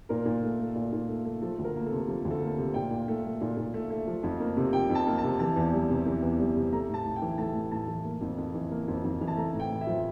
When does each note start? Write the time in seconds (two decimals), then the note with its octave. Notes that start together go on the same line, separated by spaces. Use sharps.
0.09 A#2 A#4
0.26 A#2
0.43 A3
0.60 A3
0.75 A#2
0.93 A#2
1.08 A3
1.25 A3
1.42 F3 A4
1.59 D2
1.64 A#4
1.76 A#3
1.86 A4
1.92 C3
2.08 F3
2.25 D2
2.31 A4
2.41 A#3
2.58 C3
2.74 A#2 G5
2.91 A#2
3.08 A3
3.25 A3
3.41 A#2
3.57 A#2
3.74 A3
3.90 A3
4.07 F3
4.23 F2
4.40 A#3
4.57 C3
4.73 F3 G5
4.90 F2
4.95 A5
5.07 A#3
5.18 A5
5.23 C3
5.39 E3 A5
5.56 E2
5.73 G3
5.90 C3
6.06 E3
6.22 E2
6.40 G3
6.56 C3
6.72 A3 A#5
6.89 A2 A5
7.05 A2
7.16 G5
7.22 E3
7.38 A3 A5
7.55 A2
7.72 A2 A5
7.88 E3
8.04 A#3
8.21 F2
8.38 F2
8.54 E3
8.71 A#3
8.88 F2
9.04 F2
9.21 E3
9.28 A5
9.36 A3 A#5
9.53 A2
9.60 G5
9.71 A2
9.81 E5
9.87 F3